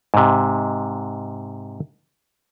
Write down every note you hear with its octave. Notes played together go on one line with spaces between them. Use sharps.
G#2 C3